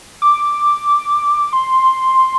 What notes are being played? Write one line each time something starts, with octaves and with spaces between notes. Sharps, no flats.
D6
C6